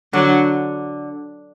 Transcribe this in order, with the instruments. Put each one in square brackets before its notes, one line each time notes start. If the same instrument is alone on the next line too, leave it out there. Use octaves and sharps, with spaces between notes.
[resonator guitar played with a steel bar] D3 [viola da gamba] F#3